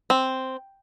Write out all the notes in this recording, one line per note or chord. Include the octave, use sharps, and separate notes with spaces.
C4